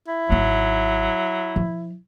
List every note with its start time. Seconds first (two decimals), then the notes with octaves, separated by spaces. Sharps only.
0.08 E4
0.29 G#1 F#3 D#4
1.56 F3